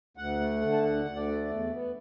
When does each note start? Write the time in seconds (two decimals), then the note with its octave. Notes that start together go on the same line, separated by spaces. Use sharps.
0.17 D2 F#5
0.40 A3
0.61 D3
0.73 A5
0.83 D2 F#5
1.05 D2
1.16 D5
1.27 A3
1.50 E2
1.71 B3